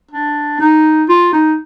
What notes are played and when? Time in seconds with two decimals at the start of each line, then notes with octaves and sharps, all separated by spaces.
0.12 D4
0.60 D#4
1.09 F4
1.33 D#4